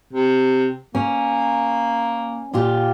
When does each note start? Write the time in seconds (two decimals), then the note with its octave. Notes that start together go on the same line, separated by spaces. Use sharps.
0.13 C3
0.95 A#3 C#4
2.53 A#2 F4 G4